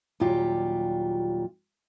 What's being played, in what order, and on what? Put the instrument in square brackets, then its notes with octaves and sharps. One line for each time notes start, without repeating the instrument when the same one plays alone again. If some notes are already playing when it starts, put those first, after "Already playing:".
[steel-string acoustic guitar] D#2 A#2 F#3 G3 F4 G4